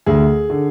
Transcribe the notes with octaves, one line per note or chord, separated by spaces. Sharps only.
D2 G#4
D3